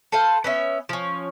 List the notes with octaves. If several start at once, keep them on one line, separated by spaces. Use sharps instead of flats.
A4 B4 C5 F5
B3 C#4 E5
F3 C#4